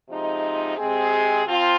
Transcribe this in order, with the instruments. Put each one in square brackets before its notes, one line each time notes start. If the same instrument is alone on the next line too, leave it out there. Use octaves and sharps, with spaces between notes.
[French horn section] C3 F3 G#3 D#4
C3 G#3 C4 G#4
F3 C4 F4